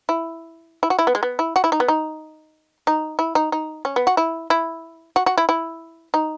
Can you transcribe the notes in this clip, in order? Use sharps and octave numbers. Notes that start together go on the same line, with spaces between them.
E4
E4
F#4
E4
B3
G#3
B3
E4
F#4
E4
D#4
B3
D#4
D#4
E4
D#4
D#4
C#4
B3
F#4
E4
E4
F#4
F#4
E4
E4
D#4